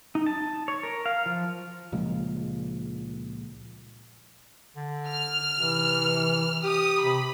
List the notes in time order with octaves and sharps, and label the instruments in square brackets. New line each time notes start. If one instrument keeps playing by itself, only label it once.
[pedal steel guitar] D#4
A5
C#5
A#4
F5
F3
[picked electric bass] C#2 A#2 F3 G#3
[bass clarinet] D3
[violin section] F6
[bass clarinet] C3 [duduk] E3
[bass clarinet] G4 [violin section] D#6
[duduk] C3 [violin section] B5